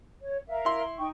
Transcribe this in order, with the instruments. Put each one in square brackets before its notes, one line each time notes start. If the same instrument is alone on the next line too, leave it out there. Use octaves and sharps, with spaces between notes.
[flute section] C#5
A#4 E5 F5
[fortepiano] E4 C6
[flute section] D#4 G5 C#6